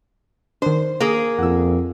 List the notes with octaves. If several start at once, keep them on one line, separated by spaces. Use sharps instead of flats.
D#3 D4 C5
A#3 G#4
F2 F#5 E6